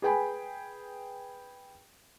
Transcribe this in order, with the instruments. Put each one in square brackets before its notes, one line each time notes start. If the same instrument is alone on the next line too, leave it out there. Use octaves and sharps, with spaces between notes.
[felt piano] G#4 B4 G5 G#5 B5